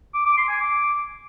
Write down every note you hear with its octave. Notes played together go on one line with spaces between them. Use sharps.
D6
D6
C6
G#5
D6